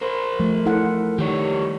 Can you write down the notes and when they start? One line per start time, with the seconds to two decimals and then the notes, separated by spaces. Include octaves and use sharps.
0.01 A#4 C5
0.40 F3 A3
0.66 E4 A4 F#5
1.18 D#3 G3 C#5